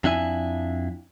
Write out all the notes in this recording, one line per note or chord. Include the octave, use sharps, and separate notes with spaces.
F2 D4 E4 E5 G#5